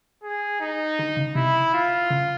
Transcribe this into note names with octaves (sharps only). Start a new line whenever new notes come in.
G#4
D#4
D3
C#3
C3 E4
F4
C#3